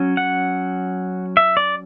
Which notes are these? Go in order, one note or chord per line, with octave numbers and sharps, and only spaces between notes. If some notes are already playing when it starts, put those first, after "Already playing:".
Already playing: F#3 C#4
F#5
E5
D5